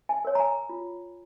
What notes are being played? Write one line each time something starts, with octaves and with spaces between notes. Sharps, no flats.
G#5
A#4 C#5
A#5
G#5
F4